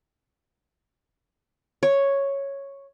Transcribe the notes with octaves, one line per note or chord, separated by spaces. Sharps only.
C#5